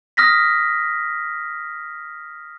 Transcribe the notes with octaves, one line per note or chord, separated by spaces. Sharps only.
D#6 F6 A#6 B6